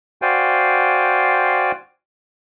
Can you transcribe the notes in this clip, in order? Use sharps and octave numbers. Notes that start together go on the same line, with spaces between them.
F#4 C5 D5 F5 G5 G#5